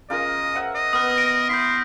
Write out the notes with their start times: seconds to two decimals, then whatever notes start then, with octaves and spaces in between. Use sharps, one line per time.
0.10 C#3 F4 A#4 D#5
0.55 C5 E5 F#5
0.75 D#5
0.93 B3 D#6 F6
1.16 A#6 D7
1.49 E4 C6 G6 B6